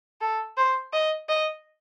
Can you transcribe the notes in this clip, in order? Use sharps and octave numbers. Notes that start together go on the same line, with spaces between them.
A4
C5
D#5
D#5